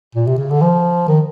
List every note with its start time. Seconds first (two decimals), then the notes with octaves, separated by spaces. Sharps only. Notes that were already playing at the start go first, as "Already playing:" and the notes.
0.15 A#2
0.27 C3
0.38 C#3
0.50 D3
0.62 F3
1.08 D#3